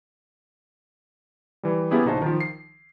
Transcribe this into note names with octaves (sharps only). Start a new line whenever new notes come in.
E3 G3
A#3 B3 C#4 E4 G4 G#4
A#1 C#3 D#4 F#4 C5 A5
D#3 F3
C7